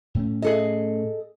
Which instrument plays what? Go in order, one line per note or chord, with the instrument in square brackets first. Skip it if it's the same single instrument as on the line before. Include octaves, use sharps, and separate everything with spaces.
[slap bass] A2 A3 C#4
[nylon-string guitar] G#4 A4 D#5